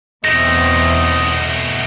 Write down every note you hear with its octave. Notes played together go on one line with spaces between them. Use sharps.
E2 B2 A3 C4 D#5 A#6